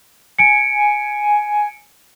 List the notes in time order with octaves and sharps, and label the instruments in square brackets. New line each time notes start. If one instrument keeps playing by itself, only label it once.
[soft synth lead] G#5 [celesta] C#7 D7